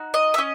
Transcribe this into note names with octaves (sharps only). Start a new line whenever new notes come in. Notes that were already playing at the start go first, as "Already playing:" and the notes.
Already playing: D#4 F#4
D#5
E5
C#4 D#5